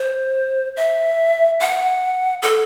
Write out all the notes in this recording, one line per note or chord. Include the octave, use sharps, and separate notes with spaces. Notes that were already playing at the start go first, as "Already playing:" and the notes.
Already playing: C5
E5
F#5
A4